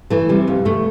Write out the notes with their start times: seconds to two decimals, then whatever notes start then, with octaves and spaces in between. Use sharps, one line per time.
0.10 E3 A3
0.29 C3 G3
0.48 F2
0.65 F2 A3